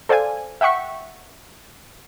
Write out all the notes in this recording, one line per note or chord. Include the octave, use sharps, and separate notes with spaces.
A4 C5 D5 F5 G#5
E5 F#5 G5 C#6 B6